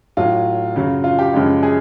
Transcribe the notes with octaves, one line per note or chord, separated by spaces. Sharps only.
A2 F#3 F4
F#2 C#3 F#3
F4
G4
F#2 C#3 F3 G#3
G#4